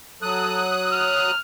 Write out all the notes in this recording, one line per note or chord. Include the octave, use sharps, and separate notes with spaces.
F#3 A4 D#6 F#6
F6